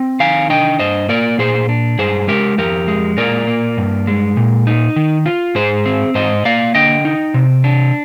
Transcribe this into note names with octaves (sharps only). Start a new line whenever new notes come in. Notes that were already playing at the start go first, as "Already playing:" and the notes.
Already playing: C4
D#3 F5 G#5
D4 D#5 G5
G2 C5 D#5
A#3 A#4 D5
A#2 G#4 C5
D4
G2 G#4 C5
G#3 G4 A#4
F2 G4 A#4
G#3
A#2 A#4 D5
A#3
G2
G#3
A#2
D#4
D#3
F4
G#2 G#4 C5
C4
G#2 C5 D#5
A#3 D5 F5
D3 D#5 G5
D#4
C3
D4